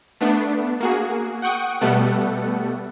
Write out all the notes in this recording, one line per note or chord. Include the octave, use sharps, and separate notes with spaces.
A3 B3 D4
A#3 F#4 G#4
F#5 G5 C#6 D#6
B2 G3 A3 B3 A4 F#5